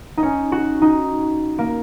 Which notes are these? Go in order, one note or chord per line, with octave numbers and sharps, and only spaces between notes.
D#4
C#4
F#4
D#4
A#3